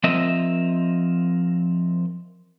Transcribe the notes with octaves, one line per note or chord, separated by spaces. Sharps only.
F3 C4 A#4 D#5 E5